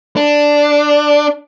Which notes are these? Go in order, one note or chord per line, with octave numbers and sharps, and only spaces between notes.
D4